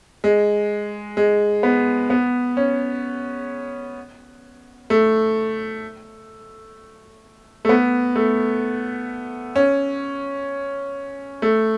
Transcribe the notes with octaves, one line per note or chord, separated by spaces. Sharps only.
G#3
G#3
B3
B3
C#4
A3
A3
B3
A3
C#4
A3